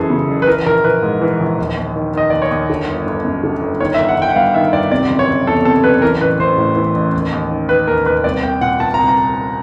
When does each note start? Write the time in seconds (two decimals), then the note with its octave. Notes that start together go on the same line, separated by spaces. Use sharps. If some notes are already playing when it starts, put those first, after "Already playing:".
Already playing: F#1 F#2 E3 G#4 A4
0.10 C#3
0.29 F#1
0.42 B4
0.47 E3 A#4
0.66 A#1 A#4
0.84 A#1 B4
1.03 G#2
1.21 E3
1.40 A#1
1.58 D#2
1.77 D#2
1.96 D#3
2.14 D#3 D#5
2.30 D#2 D5
2.42 C#5
2.51 D#2
2.70 D3
2.88 G1
3.06 G1
3.25 F#2
3.44 D3
3.62 G1
3.80 D#3 C#5
3.94 E5
3.98 G1
4.08 F#5
4.17 G1 G5
4.29 F#5
4.36 G2 F5
4.54 D#3 E5
4.73 G1 D5
4.91 C3 D5
5.10 F#1
5.19 C#5
5.28 F#1
5.47 E2 A4
5.65 C3 A4
5.84 F#1 B4
6.02 E3 A#4
6.21 A1 B4
6.39 A1 C5
6.58 A2
6.76 E3
6.95 A1
7.14 D#2
7.32 D#2
7.51 D#3
7.69 D#3 B4
7.88 D#2 A#4
8.06 D#2 B4
8.24 C2 D5
8.43 C2 G5
8.61 A#2 F#5
8.80 A#2 A5
8.94 A#5
8.99 C2
9.08 A#5